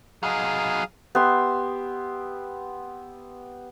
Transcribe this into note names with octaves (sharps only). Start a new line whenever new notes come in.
F#3 D#4 G#4 F5
B3 G4 E5 C6